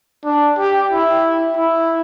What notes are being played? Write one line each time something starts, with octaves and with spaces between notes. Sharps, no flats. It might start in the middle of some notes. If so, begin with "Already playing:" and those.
D4
G4
E4
E4